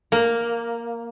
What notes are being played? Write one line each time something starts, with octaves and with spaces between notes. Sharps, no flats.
A#3